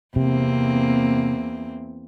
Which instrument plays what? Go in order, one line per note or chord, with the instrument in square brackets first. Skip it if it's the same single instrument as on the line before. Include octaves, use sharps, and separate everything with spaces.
[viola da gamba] E2 A#3 C4 [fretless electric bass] C3